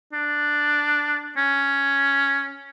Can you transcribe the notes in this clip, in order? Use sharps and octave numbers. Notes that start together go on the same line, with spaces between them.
D4
C#4